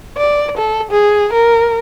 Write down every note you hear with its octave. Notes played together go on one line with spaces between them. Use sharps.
D5
A4
G#4
A#4